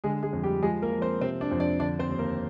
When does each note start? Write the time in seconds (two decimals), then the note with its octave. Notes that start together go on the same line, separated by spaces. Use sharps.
0.04 D3 G#3 G#4
0.23 G#3 G#4
0.33 F2
0.43 G3 G4
0.62 F3 G#3 G#4
0.82 A#3 A#4
0.92 F3
1.02 C4 C5
1.21 C3 C4 C5
1.41 D4 D5
1.51 F2 C5
1.60 D4 D5
1.80 D3 D4 D5
1.99 C4 C5
2.09 D#2
2.19 A#3 A#4